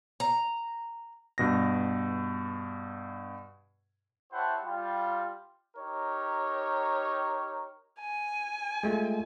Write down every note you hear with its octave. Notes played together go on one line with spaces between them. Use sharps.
A#5
G2 B2 A#6
E4 G4 C5 C#5 F#5 A5
G3 F4
D#4 G4 A#4 C#5
G#5
G#3 A3 F4